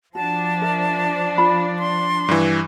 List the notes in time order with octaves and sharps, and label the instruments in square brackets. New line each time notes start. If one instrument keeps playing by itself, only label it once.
[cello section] F3 D4 [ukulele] F#4 [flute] A5
[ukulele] A#4 E5
F4 B5
[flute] C6
[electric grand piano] G2 E3